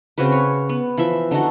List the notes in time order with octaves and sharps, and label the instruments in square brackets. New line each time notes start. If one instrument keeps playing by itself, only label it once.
[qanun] C#3 C4 F#4 B4
C#5
B3
E3 F3 E5
D3 D#4 F#4 A4